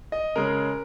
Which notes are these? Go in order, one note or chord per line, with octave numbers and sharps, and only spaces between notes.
D#5
C#3 G#3 C#4 A#4